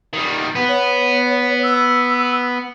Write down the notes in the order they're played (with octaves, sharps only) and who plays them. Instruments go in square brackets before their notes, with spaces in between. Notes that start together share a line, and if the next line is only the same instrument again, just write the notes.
[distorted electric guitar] D#3 G3
B3
[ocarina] C#5
E6